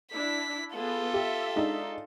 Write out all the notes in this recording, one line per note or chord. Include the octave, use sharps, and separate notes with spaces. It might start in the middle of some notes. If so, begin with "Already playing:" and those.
D4 E4 B6
B3 F4 G#4 A4
G4 E5
G#3 D4 D#4